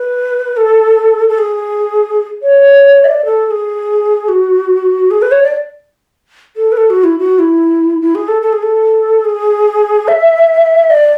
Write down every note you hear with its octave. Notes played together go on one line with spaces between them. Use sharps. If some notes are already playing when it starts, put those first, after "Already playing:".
Already playing: B4
A4
A4
G#4
C#5
E5
D5
A4
A4
G#4
F#4
G#4
B4
C#5
D5
A4
B4
A4
F#4
E4
F#4
E4
E4
G#4
A4
A4
G#4
A4
G#4
E5
D5